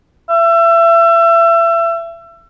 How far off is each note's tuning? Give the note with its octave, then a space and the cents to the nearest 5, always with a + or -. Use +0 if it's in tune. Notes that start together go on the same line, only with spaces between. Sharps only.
E5 +30